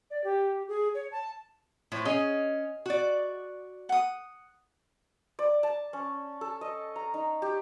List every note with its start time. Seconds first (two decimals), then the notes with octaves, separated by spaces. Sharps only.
0.11 D5
0.24 G4
0.68 G#4
0.95 C#5
1.12 A5
1.92 A2 F3
2.05 C#4 G#4 D#5
2.86 F#4 D5
3.89 F#5 D#6
5.39 D5
5.63 A5
5.93 C#4
6.41 A4
6.61 D#5
6.96 A#5
7.14 D#4
7.42 G4